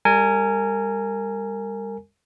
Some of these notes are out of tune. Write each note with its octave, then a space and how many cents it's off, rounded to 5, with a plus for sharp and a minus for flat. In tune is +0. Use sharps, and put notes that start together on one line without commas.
G3 +35 A#4 -25 G#5 +0